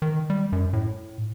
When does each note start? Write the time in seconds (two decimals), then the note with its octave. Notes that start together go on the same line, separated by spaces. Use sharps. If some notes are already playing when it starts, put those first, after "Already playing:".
0.02 D#3
0.30 G3
0.52 F#2
0.73 A2